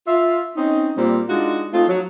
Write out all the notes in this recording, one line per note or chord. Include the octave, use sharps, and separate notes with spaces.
F4 E5
C4 C#4 D#4
A#2 G3 C4
G#3 D4 D#4 F4 F#4
A3 C4 D#4 F4
F#3